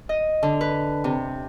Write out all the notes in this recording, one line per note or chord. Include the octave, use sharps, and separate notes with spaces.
D#5
D3
B4
C3